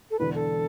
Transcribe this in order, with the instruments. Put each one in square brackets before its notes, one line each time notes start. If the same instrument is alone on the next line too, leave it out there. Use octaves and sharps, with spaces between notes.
[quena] A4
[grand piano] E1 E2 D3 [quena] B4
[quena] A4